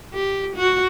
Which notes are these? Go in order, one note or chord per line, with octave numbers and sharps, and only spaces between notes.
G4
F#4